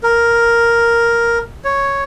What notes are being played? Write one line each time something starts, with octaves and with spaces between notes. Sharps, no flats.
A#4
C#5